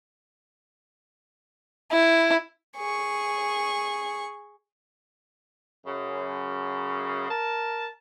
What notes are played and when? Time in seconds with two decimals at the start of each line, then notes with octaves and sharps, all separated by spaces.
1.91 E4
2.77 G#4 C#6
5.87 F#2 C#3
7.29 A#4 A5